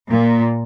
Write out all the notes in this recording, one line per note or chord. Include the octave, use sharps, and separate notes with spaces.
A#2